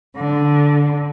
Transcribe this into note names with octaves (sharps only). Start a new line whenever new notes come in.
D3